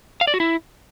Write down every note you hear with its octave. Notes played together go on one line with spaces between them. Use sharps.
F5
D5
F#4
E4